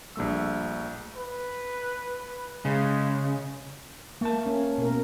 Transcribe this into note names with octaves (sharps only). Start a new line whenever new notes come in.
A#1 G2 A3 E6
B4
C#3 G#3
A3 A#3 A5
C#4
B2 A#4